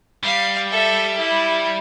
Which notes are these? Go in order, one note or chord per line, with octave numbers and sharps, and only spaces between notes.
G3 F5
A4 E5
E4